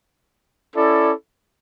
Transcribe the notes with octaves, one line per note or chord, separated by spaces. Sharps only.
C#4 E4 A4 D5